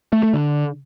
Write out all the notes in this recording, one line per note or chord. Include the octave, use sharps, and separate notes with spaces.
A3
A3
D3